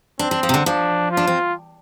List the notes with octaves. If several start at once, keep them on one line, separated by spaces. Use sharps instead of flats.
C4 D4
D4
F3
C3
D3
F3 D4
F4
D4
C4